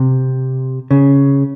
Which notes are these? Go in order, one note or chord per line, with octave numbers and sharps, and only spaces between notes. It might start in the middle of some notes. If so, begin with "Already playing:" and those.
Already playing: C3
C#3